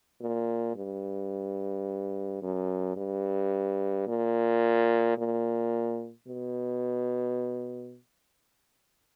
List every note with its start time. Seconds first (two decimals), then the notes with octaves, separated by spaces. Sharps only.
0.21 A#2
0.76 G2
2.42 F#2
2.97 G2
4.07 A#2
5.18 A#2
6.27 B2